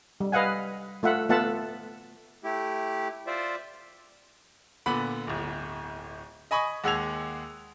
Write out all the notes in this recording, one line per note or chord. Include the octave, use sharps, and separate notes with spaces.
G3
B4 D#5 F5 F#5 G#5
A3 F4 E5 F#5
A3 B3 F4 E5 F#5 A5
A3 E4 G4
F4 C5 D5 E5
A#2 D3 B3 B5
D1 G1
D#5 G#5 B5 C#6 D#6
D#2 G#3 F#5 E6 G#6 F7